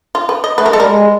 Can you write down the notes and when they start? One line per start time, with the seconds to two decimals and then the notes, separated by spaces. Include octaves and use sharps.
0.15 F4
0.29 B4
0.44 D#5
0.58 A3 B4
0.66 A#4
0.68 G#3
0.73 A4
0.77 G3 A#4
0.87 G#3